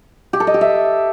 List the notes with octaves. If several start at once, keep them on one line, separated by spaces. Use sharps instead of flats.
G4
A4
D#5
G4
E5